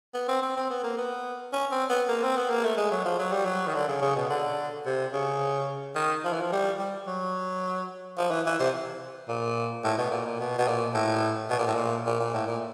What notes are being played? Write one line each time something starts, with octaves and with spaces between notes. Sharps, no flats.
B3
C4
C4
C4
B3
A#3
B3
C#4
C4
B3
A#3
C4
B3
A#3
A3
G#3
F#3
F3
F#3
G3
F#3
D#3
D3
C#3
C#3
B2
D3
C3
C#3
D#3
F3
E3
F3
G3
G3
F#3
F3
E3
E3
C3
A#2
A2
B2
A#2
A#2
B2
B2
A#2
A2
B2
A#2
A2
A#2
A#2
A#2
A2
A#2